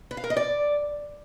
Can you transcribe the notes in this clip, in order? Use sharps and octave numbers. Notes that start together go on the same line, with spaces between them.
B4
F5
A#4
D#5
D5